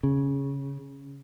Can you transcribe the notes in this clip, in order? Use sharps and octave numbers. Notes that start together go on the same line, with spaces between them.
C#3